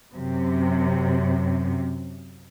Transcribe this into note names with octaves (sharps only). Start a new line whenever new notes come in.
F#2 C3